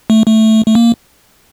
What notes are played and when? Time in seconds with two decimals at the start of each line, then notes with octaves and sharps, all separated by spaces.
0.10 A3
0.27 A3
0.66 A3
0.75 A#3